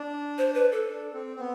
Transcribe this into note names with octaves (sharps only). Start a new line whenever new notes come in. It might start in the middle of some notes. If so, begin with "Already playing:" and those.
Already playing: D4
C5
B4
A4
D4
C4
C4
B3